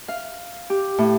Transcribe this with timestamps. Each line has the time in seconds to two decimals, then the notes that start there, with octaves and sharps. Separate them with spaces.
0.08 F5
0.70 G4
0.98 A2